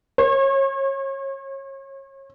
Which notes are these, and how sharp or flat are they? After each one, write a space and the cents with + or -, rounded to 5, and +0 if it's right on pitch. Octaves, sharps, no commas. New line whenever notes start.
C#5 -30